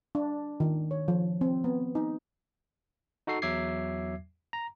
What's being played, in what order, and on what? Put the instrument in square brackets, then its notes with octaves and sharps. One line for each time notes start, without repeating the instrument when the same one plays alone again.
[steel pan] D4
D#3
C#5
F3
C4
B3
D#4
[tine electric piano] D#4 F#4 A4 C7
E2 F#3 E5 D6 G#6 C7
A#5